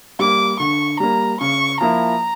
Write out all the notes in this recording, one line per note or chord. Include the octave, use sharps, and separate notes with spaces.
G3 A#3 D6
D3 C#6
G3 A#3 A#5
C#3 C#6
F3 A#3 E4 A#5